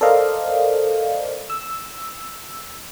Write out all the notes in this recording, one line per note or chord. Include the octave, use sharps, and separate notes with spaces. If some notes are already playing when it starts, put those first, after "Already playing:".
A4 A#4 C5 D5 D#5 F5
E6